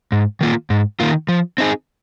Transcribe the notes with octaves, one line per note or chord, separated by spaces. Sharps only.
G#2
D#3 A#3 F4
G#2
D#3 A#3 F4
F3
C4 D#4 G#4